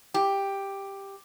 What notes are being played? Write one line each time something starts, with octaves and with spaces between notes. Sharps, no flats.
G4